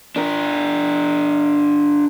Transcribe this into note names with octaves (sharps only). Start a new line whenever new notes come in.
D4 A#4